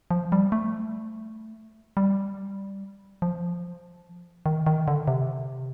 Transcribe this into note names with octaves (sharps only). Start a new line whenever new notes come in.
F3
G3
A3
G3
F3
D#3
D#3
D3
C3